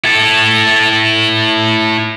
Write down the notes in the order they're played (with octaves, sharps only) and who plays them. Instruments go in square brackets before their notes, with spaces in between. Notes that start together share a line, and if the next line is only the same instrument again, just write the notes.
[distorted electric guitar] E4 A4